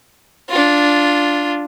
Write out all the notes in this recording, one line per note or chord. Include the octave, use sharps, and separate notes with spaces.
D4 F4